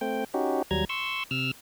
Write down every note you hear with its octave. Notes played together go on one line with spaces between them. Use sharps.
A3 C4 G5
C#4 D#4 F#4 G4
D#2 F#3 G3 A#5 G#6
C6 C#6 E6
C3 E6 F6